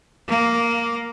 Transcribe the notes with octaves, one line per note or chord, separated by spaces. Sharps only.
A#3